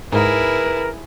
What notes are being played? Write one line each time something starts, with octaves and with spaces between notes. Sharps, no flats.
G#2 E4 G#4 A#4 B4